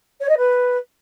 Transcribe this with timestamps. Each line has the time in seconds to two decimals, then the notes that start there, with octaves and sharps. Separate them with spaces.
0.20 C#5
0.29 D#5
0.37 B4